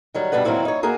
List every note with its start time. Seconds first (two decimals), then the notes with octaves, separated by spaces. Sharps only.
0.14 D#3 F#3 G3
0.32 G2 B2 G3 D4 B4 F#5
0.44 D#3 F#3 A#3 C4 E4 F#4
0.65 D#4 C#5
0.83 A#3 F#4 G#4 A#4